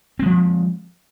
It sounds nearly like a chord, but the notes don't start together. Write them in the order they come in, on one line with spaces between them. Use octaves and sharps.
C4 G#3 F3